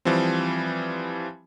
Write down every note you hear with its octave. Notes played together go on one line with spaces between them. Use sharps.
E3 F3 G3 C4